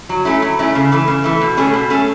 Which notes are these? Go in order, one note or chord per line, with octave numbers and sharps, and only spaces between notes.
F#3
A3 C#4 E4
F#3
A3 C#4 E4
C#3
E3 A3
C#3
E3 A3
B2
A3 C#4 G#4
B2
A3 C#4 G#4